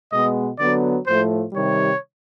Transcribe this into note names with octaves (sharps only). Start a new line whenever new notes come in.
B2 G#3 B3 D#5
D3 F#3 B3 D5
A2 F3 A3 C5
C3 D#3 G3 C#5